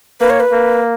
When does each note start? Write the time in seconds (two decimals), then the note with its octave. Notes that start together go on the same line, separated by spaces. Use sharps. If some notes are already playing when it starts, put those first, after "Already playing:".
0.20 A#3 B4
0.30 C#5
0.40 B4
0.52 A#3